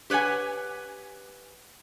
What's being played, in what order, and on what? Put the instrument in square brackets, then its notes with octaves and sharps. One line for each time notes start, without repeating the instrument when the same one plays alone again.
[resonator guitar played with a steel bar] G4 B4 C#5 F#5 G#5